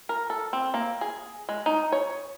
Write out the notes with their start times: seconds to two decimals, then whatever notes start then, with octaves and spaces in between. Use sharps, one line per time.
0.09 A#4
0.30 A4
0.53 C4
0.74 A#3
1.01 G#4
1.49 G#3
1.66 D#4
1.92 C#5